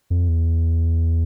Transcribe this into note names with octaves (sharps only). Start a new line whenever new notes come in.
F2
E2